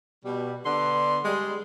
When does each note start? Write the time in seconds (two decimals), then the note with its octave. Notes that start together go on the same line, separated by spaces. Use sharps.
0.24 B2 G3
0.65 D3 B3 D4 C6
1.24 G3 G#3